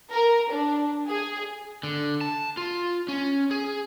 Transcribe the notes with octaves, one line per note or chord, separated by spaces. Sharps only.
A#4
D4
G#4
D3
A5
F4
C#4
G#4